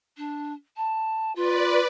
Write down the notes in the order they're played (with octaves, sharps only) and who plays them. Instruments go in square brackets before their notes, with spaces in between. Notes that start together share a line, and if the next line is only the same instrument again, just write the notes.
[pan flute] D4
A5
[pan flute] F4 [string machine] B4 D5